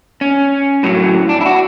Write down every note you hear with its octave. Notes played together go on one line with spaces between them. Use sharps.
C#4
A2 F#3
D4
E4
F#4